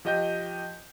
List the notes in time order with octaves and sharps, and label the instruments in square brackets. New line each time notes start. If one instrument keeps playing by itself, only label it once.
[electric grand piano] F3 G4 D#5 G5 G6